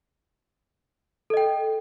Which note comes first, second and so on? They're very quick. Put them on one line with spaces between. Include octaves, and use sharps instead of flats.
A4 D#5 G5